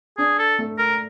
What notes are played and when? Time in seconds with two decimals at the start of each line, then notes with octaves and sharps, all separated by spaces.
0.18 D4 G#4
0.39 A4
0.59 A3
0.78 A#4